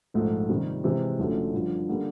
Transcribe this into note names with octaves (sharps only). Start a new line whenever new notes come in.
A#1 G#2 F3 A3
C3 D#3 G3
C3 E3 G#3
F#1 F#2 D3 F3 A3
G2 D3 F3
D3 G3 A#3